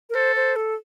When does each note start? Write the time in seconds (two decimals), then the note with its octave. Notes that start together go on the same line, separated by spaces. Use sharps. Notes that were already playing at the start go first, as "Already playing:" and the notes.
0.10 A#4
0.15 A4 C5
0.36 C5
0.56 A4